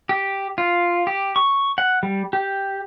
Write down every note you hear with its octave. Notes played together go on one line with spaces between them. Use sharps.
G4
F4
G4
C#6
F#5
G3
G4